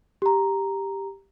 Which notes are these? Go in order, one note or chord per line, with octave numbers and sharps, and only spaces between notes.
G4 A#5